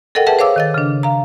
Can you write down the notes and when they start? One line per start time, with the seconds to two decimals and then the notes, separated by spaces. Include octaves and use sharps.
0.15 A4 A#4 D#5 F#5 G5
0.26 G#4 B4 E5 F#5 G5 A5
0.39 C5 C#5 F5 D6 E6
0.56 D#3 D#5 A6
0.74 C#3 D4
1.03 F5 A#5